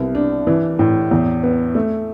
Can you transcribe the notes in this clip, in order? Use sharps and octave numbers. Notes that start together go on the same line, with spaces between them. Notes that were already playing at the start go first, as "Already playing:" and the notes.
Already playing: C2 B3
D4
E3
A2
E2
B3
A3